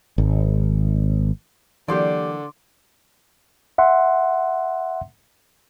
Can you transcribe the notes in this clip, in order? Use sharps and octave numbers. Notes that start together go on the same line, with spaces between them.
G#1
D3 E3 F#3 A#3 G4 D5 C6 D6
E5 F#5 C6